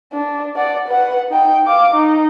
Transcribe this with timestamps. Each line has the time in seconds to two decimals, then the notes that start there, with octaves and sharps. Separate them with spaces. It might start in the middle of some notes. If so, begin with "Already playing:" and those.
0.12 D4
0.56 D5 F#5
0.87 B4 F#5
1.30 D#4 G5
1.65 F5 D6
1.94 D#4